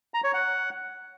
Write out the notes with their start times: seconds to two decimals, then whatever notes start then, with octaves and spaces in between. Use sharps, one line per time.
0.14 A#5
0.24 C#5
0.34 F#5